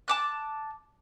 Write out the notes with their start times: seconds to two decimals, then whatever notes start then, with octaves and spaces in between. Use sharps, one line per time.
0.08 A5 D6 F#6